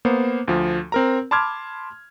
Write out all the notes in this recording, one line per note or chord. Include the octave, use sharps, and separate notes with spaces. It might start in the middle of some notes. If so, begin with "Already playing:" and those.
A#3 B3 C5
D2 F3
C4 A#4 A#5
A5 B5 C6 D6 F6 G#6